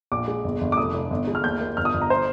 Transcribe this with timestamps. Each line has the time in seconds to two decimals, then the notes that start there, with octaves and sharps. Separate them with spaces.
0.12 A#1 D6
0.28 G#3
0.44 G1
0.61 G1
0.72 D6
0.77 F1 D#6
0.94 F1
1.10 G1
1.27 G#3
1.35 F6
1.44 D#2 G6
1.61 A#3
1.77 G1 F6
1.85 D#6
1.94 G1
2.02 A#5
2.10 C5